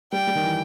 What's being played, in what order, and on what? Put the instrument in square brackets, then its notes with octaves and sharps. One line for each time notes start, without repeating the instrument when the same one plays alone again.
[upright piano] G3 [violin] G5
[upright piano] G3
D#3
E3